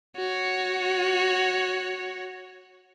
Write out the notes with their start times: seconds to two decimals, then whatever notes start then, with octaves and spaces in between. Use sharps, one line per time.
0.16 F#4 C#5